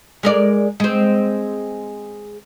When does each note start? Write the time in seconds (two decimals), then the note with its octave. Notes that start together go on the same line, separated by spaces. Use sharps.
0.23 G#3 A#4 D5
0.80 G#3 C4